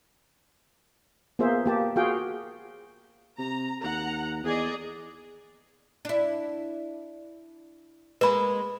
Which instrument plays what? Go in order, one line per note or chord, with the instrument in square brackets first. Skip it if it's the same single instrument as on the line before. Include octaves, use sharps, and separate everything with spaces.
[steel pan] A#3 B3 F4 G#4 C5 E5
A#3 G4 A5
F4 F#4 G#4 F5 G5
[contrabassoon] C3 [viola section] A#5
[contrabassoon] D#2 [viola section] F#5 A#5
[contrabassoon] E2 [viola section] G#4 D5 D#5
[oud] D4 E4
[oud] G#3 A#3 [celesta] B4 B5